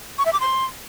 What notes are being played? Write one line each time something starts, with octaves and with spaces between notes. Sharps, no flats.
C#6
E5
D6
C6